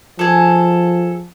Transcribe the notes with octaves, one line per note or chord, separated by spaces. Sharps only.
F3 G#4 A4